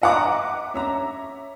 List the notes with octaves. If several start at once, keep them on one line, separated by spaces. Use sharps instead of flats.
D#5 E5 F#5 A#5 D6
C#4 E5 A#5